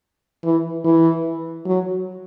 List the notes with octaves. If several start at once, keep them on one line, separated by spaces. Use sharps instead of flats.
E3
E3
F#3